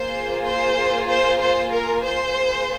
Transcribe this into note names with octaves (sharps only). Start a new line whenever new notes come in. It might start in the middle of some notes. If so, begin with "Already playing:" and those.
Already playing: A#3 F4 G#4 C5
C5
C5
C5
A#4
C5
A#3 F4 G#4